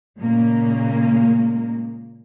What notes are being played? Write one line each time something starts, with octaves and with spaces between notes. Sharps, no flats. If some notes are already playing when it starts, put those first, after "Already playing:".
A#2 C#3 G#3 A#3